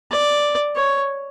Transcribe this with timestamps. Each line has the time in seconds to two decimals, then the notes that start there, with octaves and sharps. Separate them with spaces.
0.12 D5
0.76 C#5